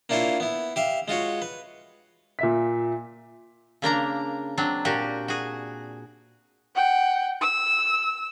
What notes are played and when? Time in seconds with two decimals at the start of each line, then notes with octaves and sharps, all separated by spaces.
0.09 A#3 D4 E4 F4 C5 C#5
0.40 B3 E4
0.76 G4 E5 F5
1.08 G#3 F4 F#4 C#5
1.42 B4
2.39 A#2 E5 B6
3.82 C#3 A#3 D4 A#5
4.57 F#3 C4 D4
4.85 A#2 F#4 G4
5.28 F#4 G#4
6.75 F#5 G5
7.41 E6